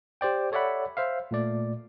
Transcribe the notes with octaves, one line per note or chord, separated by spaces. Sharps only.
G4 C5 D5 G5
A4 C#5 D5 E5 F#5 B5
C5 E5 F5
A#2 A3 D5